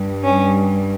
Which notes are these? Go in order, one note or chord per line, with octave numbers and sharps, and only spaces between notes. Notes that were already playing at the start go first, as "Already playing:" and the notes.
Already playing: G2 G3
C#4